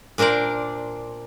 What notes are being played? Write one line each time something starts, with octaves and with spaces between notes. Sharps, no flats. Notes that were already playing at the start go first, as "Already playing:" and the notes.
A#2 D4 A#4 C5 D5